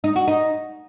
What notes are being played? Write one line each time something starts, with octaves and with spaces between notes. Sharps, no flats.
D#4
F#4
D#4